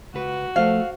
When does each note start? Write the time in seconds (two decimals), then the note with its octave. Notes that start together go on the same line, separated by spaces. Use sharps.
0.14 C#2 F#4 B4
0.56 F3 A3 C5 F5